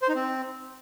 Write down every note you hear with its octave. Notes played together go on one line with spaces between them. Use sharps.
C5
D#4
C4